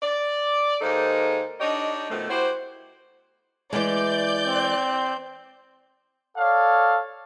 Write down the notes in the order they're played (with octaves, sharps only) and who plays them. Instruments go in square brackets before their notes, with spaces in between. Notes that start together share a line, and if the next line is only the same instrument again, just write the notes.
[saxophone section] D5
D#2 G#3 A#3 D#4 A4 C5
D4 D#4 G4 C#5 D#5
B2 D#3 F3 A3
E4 F#4 G4 C5
[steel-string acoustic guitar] E3 G#3 [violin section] D5 G6
[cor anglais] C4
[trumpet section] A4 C#5 D5 F5